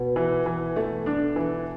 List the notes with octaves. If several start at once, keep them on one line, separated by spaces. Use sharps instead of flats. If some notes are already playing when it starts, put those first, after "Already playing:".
Already playing: B2
E3
E3
A3
D4
E3